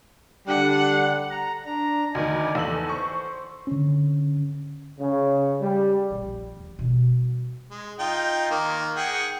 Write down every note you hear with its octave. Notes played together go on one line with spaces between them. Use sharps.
D3 G3 D4 F#5
A#5
D4 A#5
D2 D#3 D#4 D5 G#5
E2 A4 E6 F#7
C5 C#6
D3 C#4
C#3
G3
A#1
D#2
B2 G3
G#3
D#4 F4 G5
D#3 A#3
G#4 F#5 G5